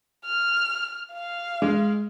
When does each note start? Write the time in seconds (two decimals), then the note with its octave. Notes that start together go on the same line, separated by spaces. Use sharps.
0.25 F6
1.12 F5
1.62 G#3